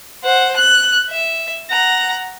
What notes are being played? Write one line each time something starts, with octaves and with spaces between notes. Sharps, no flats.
C5 F#5
F#6
E5
F#5 A#5